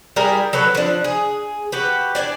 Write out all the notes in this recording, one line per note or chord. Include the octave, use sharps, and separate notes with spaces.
G3 E4 G#4 A#4
F#3 A4 B4 C#5
F3 D4
G#4
F#4 G4 B4
D4 D5 G5 G#5